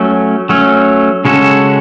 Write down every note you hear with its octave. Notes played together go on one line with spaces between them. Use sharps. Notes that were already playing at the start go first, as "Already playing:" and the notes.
Already playing: F#3 A3 C#4
F#3 A3 C#4
C#3 G#3 C#4 F#4 A4